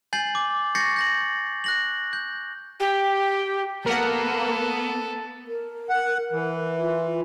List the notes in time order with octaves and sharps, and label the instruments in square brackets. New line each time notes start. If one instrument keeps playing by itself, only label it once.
[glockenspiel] G#5 G6 A6 C7 F#7
D6
C#6 G6 A6 A#6 C7 C#7
G6 A#6 F#7
F#6 A#6 F#7
G6
[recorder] G4
[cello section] A#3 [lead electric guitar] B3 [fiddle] A4 [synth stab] A#4 F#5
[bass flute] A#4
[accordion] F#5
E3
[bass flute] F4